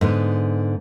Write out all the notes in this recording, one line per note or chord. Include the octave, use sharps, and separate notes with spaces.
G#2 D3 B3